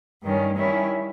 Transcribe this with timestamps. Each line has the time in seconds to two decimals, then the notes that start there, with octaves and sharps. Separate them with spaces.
0.23 G2 D#3 G3 C#4
0.56 D#3 G3 C#4 E4